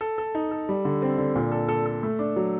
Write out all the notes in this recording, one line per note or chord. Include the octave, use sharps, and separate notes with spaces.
A4
A4
D#4
A4
G3
D3
C4
D3
A#2
A4
A4
A4
A3
D4
F#3